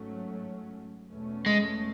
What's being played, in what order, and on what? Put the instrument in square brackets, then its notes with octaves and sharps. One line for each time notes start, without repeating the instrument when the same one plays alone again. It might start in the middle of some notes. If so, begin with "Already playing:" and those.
Already playing: [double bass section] G#2 F#3 A3 C#4
E2 B2 A3 C#4
[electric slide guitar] G#3